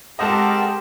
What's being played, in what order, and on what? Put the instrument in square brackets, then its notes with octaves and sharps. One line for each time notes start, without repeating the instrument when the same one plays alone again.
[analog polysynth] G#3 F#5 [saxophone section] C4 A4 A#4 [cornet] G4 [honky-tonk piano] D#5 A5